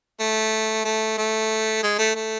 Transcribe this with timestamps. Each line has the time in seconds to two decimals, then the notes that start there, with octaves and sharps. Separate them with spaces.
0.20 A3
0.85 A3
1.18 A3
1.83 G#3
1.99 A3
2.15 A3